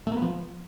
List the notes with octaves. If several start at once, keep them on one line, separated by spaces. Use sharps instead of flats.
A3
A#3
B3
F3